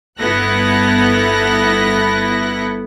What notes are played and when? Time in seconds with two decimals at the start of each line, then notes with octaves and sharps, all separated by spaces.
0.19 G1 B3 E4 A4 F#6 A#6